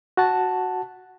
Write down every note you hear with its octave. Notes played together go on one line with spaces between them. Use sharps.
F#4 F#5 A5